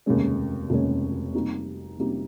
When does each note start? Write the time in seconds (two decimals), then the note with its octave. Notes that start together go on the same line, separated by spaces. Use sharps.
0.06 F1 D#2 C#3 G#3 C#4
0.70 F1 D#2 C#3 G#3 C#4
1.34 C3 G3 A#3 D#4 G4
1.98 C3 G3 A#3 D#4 G4